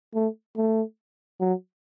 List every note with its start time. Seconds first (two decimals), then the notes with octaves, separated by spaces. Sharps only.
0.14 A3
0.57 A3
1.40 F#3